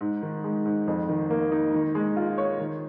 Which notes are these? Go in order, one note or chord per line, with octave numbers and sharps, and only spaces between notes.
G#2
D#3
G#3
G#2
F2
D#3
A#3
D#4
D#3
G#3
F4
C#5
D#3